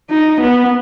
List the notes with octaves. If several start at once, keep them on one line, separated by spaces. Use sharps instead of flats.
D#4
B3